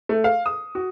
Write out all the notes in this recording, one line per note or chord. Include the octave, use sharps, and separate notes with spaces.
A3
F5
D#6
F#4